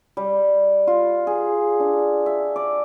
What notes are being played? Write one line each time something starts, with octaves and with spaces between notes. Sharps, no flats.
G3
F4
G#4
D4
E5
D5